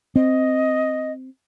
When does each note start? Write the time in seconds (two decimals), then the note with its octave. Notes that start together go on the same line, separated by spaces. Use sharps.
0.16 C4 D#5